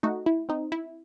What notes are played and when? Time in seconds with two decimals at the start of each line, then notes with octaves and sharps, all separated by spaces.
0.03 A3 D#4 F#4
0.26 E4
0.49 C4 D#4
0.72 E4